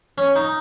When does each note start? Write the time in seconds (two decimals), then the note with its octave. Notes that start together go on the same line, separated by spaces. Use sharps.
0.18 C#4
0.36 D#4